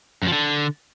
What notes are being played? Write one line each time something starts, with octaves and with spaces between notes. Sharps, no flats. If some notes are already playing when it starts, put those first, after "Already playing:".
F#2
F3
D3